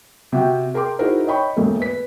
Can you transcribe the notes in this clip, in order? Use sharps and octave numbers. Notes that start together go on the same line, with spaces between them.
C3 F#4 G5
G#4 A#4 G5 C6 D6
D#4 E4 F#4 G#4 A#4 C5
C#5 D#5 G5 B5 C#6
E1 G#2 A3 A#3
B4 B6